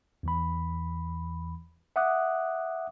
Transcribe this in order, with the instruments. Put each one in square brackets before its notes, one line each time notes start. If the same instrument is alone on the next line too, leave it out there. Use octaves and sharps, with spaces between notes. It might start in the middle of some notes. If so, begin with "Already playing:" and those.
[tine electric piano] E2 E3 B5
E5 F#5 D6 D#6 F#6